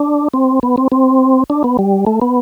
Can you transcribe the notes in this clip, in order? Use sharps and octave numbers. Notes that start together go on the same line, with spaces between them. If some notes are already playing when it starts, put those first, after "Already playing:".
Already playing: D4
C4
B3
C4
C4
D4
B3
G3
A3
B3